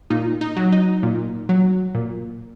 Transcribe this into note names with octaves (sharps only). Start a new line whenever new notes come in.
A#2 D#4
D#4
F#3
D#4
A#2
F#3
A#2